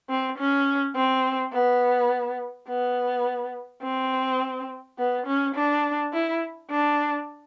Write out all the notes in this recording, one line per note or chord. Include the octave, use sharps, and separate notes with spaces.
C4
C#4
C4
B3
B3
C4
B3
C#4
D4
E4
D4